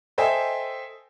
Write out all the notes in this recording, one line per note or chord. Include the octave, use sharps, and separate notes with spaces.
A4 C5 D#5 E5 G5 G#5